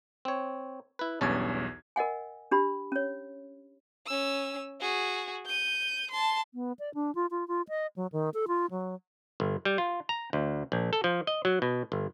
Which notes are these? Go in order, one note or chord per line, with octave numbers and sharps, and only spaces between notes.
C4 C#5
E4 B4
B1 E2 G2 C#4 A5 G#6
A#4 D#5 F#5 G#5
D4 G4 B5
C#4 C#5
C#4 E6
F#4 G#4
G6 D#7
A5 C6
B3
D5
D4
F4
F4
F4
D#5
F#3
D#3
A4
F4
F#3
G1
G3
F4
A#5
D2
A#1
A4
F3
D#5
F#3
B2
G1